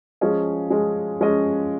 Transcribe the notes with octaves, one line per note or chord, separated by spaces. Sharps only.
F3 G#3 C#4 G#4 D#5
F3 G#3 C#4 G#4 D#5
F3 G#3 C#4 G#4 D#5